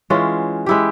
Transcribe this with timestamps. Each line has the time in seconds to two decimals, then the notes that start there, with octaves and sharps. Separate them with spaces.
0.10 E3 G#3 C#4 F4
0.66 G#3 E4 G4